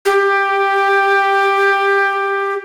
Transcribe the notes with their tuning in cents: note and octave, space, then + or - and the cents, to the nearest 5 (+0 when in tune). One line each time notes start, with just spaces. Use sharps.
G4 +10